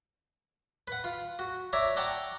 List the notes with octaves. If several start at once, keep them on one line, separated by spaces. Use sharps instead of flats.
B4 F#5
F4
F#4
C#5 D5 E5 A#5 C#6
D5 F#5 G5 A5 A#5 C#6